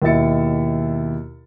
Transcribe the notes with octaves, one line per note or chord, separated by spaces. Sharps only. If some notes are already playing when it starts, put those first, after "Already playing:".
D#2 B2 E4 E5 A6 C#7